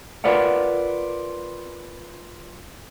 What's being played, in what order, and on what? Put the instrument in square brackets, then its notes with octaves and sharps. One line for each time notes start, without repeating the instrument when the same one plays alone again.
[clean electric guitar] F4 A#4 B4 D5 F5 F#5